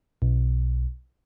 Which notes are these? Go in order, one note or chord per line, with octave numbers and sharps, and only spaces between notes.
B1